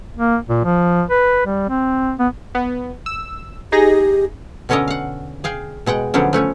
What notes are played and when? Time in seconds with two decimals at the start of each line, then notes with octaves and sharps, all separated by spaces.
0.17 A#3
0.49 A#2
0.65 F3
1.10 B4
1.46 G3
1.69 C4
2.19 B3
2.55 B3
3.06 E6
3.72 D#4 G4 G#4 A#6
4.69 B2 D3 C#4 A4 A#4 D#5
4.88 F5 F#5
5.44 G#4 F5 G5
5.86 B2 G#3 F#5 G5
6.14 D3 F3 F#3 B3 C#4 D4
6.33 F3 A3 C#4 C#5